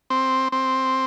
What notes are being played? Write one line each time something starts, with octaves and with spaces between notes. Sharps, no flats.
C4
C4